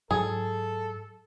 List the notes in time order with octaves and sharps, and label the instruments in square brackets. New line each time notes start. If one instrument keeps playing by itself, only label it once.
[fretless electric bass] G#2 F#3 [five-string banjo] G#4 [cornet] A4